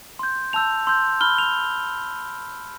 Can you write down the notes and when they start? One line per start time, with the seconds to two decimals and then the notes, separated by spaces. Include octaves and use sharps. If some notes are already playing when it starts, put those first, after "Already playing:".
0.19 C6 G6
0.53 A5 E6 G6 F7
0.87 C6 E6 G6
1.21 B5 F6 G7
1.38 F7